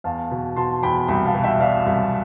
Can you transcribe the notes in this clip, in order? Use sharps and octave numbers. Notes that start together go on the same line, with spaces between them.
E2 F5 A5
B2
B2 A5 C6
E2 G5 B5
C2 G5 B5
F5 A5
B2
E5 G5
B2 D5 F5
C2